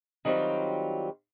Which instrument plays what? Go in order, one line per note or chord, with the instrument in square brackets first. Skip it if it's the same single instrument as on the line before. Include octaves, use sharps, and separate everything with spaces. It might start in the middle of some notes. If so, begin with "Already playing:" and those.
[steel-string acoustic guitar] D#3 F#3 G3 C4 F4